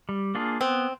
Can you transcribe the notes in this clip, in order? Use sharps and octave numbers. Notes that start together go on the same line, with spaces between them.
G3
A#3 D4 F4 G#4
B3 C4